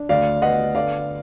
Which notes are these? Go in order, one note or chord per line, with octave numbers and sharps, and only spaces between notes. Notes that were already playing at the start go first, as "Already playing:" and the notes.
Already playing: D4
D2 D5 F5
B3 D#5 F#5
D3 D5 F5